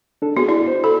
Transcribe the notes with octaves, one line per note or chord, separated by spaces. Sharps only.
D4 A4
B3 F#4 G#4
E4 D5
C5
A4 B5